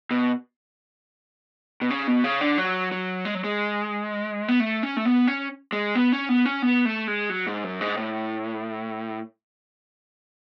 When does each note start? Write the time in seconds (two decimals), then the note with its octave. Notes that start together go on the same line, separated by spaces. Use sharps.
0.11 B2
1.82 B2
1.90 C#3
2.07 B2
2.24 C#3
2.41 D3
2.58 F#3
2.92 F#3
3.25 G#3
3.35 F#3
3.44 G#3
4.48 B3
4.60 A3
4.83 C#4
4.97 A3
5.05 B3
5.27 C#4
5.72 G#3
5.95 B3
6.12 C#4
6.29 B3
6.46 C#4
6.62 B3
6.86 A3
7.08 G#3
7.30 F#3
7.47 G#2
7.64 F#2
7.81 G#2
7.97 A2